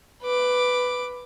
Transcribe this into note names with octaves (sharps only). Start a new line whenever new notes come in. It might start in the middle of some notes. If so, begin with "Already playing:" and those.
B4 D6